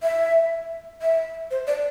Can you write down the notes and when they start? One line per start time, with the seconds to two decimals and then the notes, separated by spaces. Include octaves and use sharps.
0.03 E5
1.02 E5
1.51 C5
1.67 D5